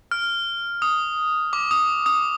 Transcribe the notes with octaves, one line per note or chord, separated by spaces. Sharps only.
F6
D#6
D6
D#6
D#6